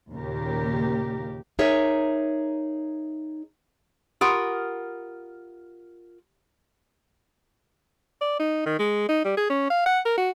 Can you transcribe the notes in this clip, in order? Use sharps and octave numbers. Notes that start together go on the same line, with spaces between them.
D#2 A#2 C#3 G4 A#4
D#4 G#4 A#4 C#5 E5
F4 G4 A#4 F#5 B5 D#6
D5
D#4
D#3
G#3
D#4
G3
G#4
C#4
F5
F#5
A#4
F#4